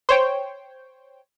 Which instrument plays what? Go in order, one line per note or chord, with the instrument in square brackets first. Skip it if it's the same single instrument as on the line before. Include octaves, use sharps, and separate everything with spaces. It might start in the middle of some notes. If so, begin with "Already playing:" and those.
[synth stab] C5 C#5 G5